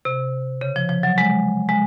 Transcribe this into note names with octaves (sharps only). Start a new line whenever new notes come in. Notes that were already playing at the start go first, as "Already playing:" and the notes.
C3
C#3
F3
F3
F#3
G#3
G#3